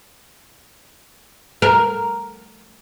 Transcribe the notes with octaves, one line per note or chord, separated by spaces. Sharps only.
A#4